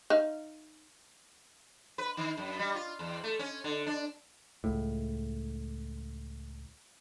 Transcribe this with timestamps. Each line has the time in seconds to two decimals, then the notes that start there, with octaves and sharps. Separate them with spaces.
0.10 D#4 F5
1.98 B4
2.17 D#3
2.37 F#2
2.59 G3
2.75 F4
2.99 E2
3.24 A3
3.39 C#4
3.64 D3
3.87 D4
4.64 C#2 A2